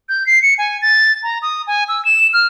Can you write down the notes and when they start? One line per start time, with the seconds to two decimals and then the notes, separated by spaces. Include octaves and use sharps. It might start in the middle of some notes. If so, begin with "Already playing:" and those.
0.09 G6
0.26 C7
0.42 C#7
0.58 G#5
0.82 A6
1.23 A#5
1.42 D#6
1.67 G#5
1.89 E6
2.05 E7
2.33 F6